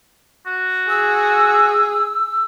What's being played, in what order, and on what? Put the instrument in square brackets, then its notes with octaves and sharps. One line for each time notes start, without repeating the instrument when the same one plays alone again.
[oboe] F#4
[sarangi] G#4 [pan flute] E6